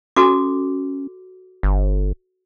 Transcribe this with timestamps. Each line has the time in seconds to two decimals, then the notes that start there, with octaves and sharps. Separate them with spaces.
0.16 C#4 F#4 A4 D6
1.63 G1